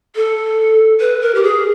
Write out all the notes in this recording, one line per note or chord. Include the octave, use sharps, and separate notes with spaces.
A4
B4
A#4
G4
G#4